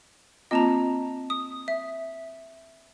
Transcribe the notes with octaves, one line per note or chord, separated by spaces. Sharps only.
A#3 C4 F4 D#5 A5 A#5
D#6
E5